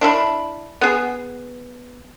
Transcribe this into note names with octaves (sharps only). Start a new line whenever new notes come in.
D4 E4 E5 B5
B3 G#4